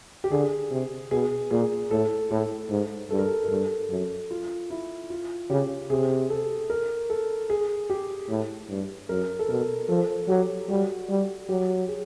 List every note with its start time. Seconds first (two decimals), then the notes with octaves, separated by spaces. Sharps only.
0.24 G4
0.31 D3 G#4
0.71 C3
1.11 B2 G#4
1.51 A#2 G#4
1.91 A2 A4
2.31 A2 A4
2.70 G#2
3.10 G2 A4
3.19 A#4
3.27 A4
3.45 A#4
3.50 G2 A4
3.90 F#2 A4
4.30 F4
4.70 E4
5.10 F4
5.50 C#3 G4
5.90 C3 G#4
6.30 A4
6.70 A#4
7.10 A4
7.50 G#4
7.90 G4
8.29 A2
8.69 G2
9.09 F#2 A#4
9.39 A4
9.49 B2 A#4
9.89 F3 A4
10.29 F#3 G4
10.69 G3 F#4
11.09 G3
11.49 F#3 G4
11.88 G#4